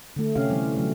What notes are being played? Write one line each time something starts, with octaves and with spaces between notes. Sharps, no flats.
D3 A3
C3 C4 C#4 G4 F5
E3 G3 C4
D3 F#3 A3